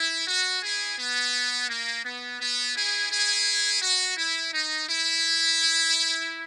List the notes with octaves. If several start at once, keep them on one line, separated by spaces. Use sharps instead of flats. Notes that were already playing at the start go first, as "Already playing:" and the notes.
Already playing: E4
F#4
E4 G#4
B3
A#3
B3
B3
E4 G#4
E4 G#4
F#4
E4
D#4
E4